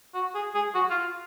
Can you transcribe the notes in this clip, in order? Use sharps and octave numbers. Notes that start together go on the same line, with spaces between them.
F#4
G#4
G#4
F#4
F4